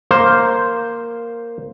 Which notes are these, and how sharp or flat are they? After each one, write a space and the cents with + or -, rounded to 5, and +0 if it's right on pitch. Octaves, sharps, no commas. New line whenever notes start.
A#3 +0 C5 +0